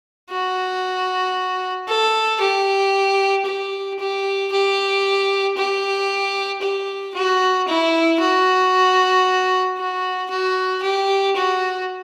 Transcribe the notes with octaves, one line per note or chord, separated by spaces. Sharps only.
F#4
A4
G4
G4
G4
G4
G4
G4
F#4
E4
F#4
F#4
F#4
G4
F#4